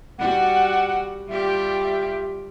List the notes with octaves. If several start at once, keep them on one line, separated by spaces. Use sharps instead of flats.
G3 F#4 F#5
G3 F4 G4 E5